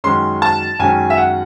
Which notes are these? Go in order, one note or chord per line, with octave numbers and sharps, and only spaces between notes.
F#2 D#3 G#3 C#4 C6
A5
F#2 D#3 G#3 C#4 G#5
E5
F#5